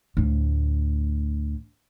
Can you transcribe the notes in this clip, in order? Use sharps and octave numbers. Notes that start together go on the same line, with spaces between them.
D2 A2